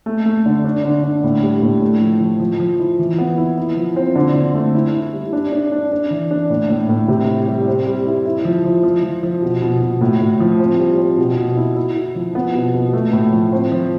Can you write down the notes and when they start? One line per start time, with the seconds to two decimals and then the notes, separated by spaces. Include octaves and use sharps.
0.06 A3
0.26 A3
0.46 D3
0.64 D4
0.85 D3
1.03 D4
1.23 A2
1.42 G3
1.62 A2
1.82 A3
2.01 F3
2.21 F3
2.40 F3
2.60 F3
2.79 E4
2.99 E3
3.18 B3
3.38 E4
3.57 E4
3.77 F3
3.96 C4
4.16 D3
4.36 D3
4.54 A3
4.74 E4
4.94 E4
5.13 G3
5.33 D4
5.52 D4
5.72 D4
5.91 D4
6.11 E3
6.31 D4
6.50 A2
6.69 A2
6.89 A2
7.08 C3
7.28 E4
7.47 G3
7.67 C4
7.86 G3
8.06 E4
8.25 E4
8.45 F3
8.64 F3
8.83 F3
9.03 F3
9.23 F3
9.42 B2
9.62 B2
9.82 B2
10.01 A2
10.20 A2
10.40 F3
10.60 C4
10.79 G3
10.98 C4
11.18 B2
11.38 B2
11.57 E4
11.76 E4
11.96 E4
12.16 F3
12.35 B3
12.55 B2
12.74 B2
12.93 A3
13.13 A2
13.33 F3
13.52 C4
13.72 F3